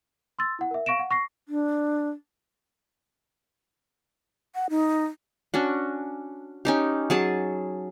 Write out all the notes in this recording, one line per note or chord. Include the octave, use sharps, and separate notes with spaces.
C6 E6 A6
E4 F#5
A#4 E5
F5 C#6 A#6 D7 E7
F#5
C#6 A#6 C7
D4
F#5
D#4
C#4 D4 F#4
C#4 D#4 G4
F#3 G#4 A5